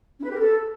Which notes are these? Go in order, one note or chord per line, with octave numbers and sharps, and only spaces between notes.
C#4
B4
G4
A#4
A4